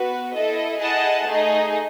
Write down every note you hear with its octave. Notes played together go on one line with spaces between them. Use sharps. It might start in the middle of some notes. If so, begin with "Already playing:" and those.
Already playing: B3 F#4 B4
E4 A4 D#5
E4 G#4 D#5 F#5 A5
A3 D#4 G#4 D#5